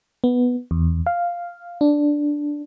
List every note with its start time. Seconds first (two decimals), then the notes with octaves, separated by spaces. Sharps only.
0.24 B3
0.71 E2
1.06 F5
1.81 D4